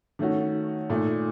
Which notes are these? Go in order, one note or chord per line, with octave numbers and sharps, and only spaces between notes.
D#3 A3 C#4 F#4
A#2 A3 D#4